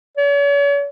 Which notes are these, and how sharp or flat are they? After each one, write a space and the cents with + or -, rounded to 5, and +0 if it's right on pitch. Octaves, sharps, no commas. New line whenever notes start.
C#5 +40